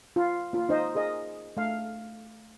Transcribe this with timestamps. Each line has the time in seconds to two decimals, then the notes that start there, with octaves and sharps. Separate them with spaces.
0.16 F4
0.53 A#3 F4
0.69 D#4 C5 D#5
0.95 G#4 A#4 D#5
1.57 A3 F5